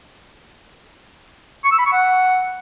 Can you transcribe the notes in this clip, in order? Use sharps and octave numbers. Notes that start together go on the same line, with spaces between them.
C#6
E6
B5
C#6
F#5